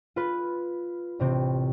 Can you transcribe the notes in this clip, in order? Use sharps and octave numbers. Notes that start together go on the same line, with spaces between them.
F4 B4
A1 C3 C4